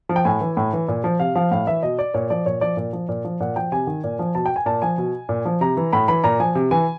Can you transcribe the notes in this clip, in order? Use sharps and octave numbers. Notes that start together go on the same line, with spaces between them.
F3
G5
A2 G#5
E3
A2
E3
A#2
F3
C3 F5
F3 F5
A2 F5
E3 E5
B2 D#5
D5
A#2 C#5
F3 D5
A#2 C#5
F3 D5
A#2
F3
A#2
F3
A#2 F#5
F3 G5
C3 G#5
D#3
A#2
F3
B2 A5
G5
G#5
A#2 A5
F3 G#5
B2
A#2
F3
C3 A#5
E3
A2 B5
E3 B5
A#2 A#5
F3 G#5
C3
E3 G#5